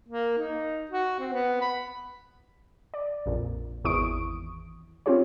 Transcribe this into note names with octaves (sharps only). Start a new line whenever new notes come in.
A#3
D#4
F#4
C4
B3
B5
D5
A#1 F2 A#2
G#1 E2 E4 C#6 D#6 D7
C4 C#4 F4 G4 C#5